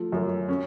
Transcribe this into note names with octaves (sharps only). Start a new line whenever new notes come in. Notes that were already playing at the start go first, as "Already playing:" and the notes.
Already playing: F3 A3
F#2
C#4